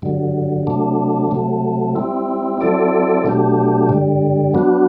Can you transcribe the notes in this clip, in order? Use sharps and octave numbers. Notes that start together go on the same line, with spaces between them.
G2 D3 F#3
C3 F#3 A3 D4
C3 F#3 A3
G3 C4 E4
F#3 C4 E4 A4 D5
B2 F#3 A3 D4 G4
G2 D3 G3
F#3 B3 D4 F#4